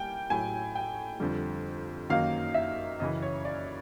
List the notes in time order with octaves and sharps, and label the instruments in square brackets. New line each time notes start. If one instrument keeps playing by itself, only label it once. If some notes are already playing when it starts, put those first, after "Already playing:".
Already playing: [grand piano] G3 A#3 [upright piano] G5 G#5
[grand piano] A2 F#3 A3 [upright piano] G#5
[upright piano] G5
[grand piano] F2 D3 G3
[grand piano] F#2 D#3 F#3 A#3 D#4 [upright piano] F5
[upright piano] E5
[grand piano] F#2 C#3 E3 [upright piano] D#5
[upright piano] C#5
D5